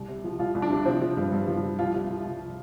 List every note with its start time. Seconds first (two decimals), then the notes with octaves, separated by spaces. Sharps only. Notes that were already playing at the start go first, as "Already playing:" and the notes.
Already playing: C2
0.08 C3
0.24 F3
0.39 C2 F4
0.55 C2
0.62 D4
0.71 C3
0.85 F3 C4
1.02 F3
1.17 G2
1.32 G2
1.48 F3
1.63 F3
1.79 C2 F4
1.94 C3
2.10 F3
2.26 C2